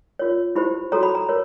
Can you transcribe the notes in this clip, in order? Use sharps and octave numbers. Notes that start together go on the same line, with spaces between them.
F4 A#4 C#5
E4 G4 C5 B5
F#4 A4 C#5 A#5
B5
A#5
A#4 C#5